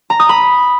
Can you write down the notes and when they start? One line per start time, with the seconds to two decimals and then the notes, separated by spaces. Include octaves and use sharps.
0.10 A#5
0.20 D#6
0.29 B5